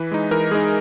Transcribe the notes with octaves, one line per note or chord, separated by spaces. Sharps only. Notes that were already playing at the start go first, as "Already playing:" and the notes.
Already playing: E3 B4
G#3 D#4
E3 A#4
G#3 D#4 G#4